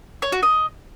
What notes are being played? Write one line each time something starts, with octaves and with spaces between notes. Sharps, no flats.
C#5
F#4
D#5